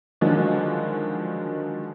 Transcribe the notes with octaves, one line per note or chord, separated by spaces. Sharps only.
D3 D#3 F3 F#3 G#3 D4